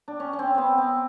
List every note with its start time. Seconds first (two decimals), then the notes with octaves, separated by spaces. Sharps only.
0.08 D4
0.20 C#4
0.33 C#4
0.39 C4
0.55 B3 C4
0.78 C4